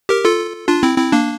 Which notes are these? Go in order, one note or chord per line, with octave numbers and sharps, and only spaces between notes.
G4 A#4
F4 A4
D4 F4
C4 E4
C4 E4
A#3 D4